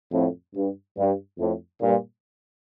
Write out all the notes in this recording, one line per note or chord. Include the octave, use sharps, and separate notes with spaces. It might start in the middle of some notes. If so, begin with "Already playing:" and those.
F2 A2
G2
G2
F2 A2
G2 A#2